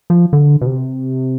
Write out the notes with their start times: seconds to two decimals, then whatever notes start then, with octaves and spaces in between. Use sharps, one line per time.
0.10 F3
0.33 D3
0.61 B2
0.66 C3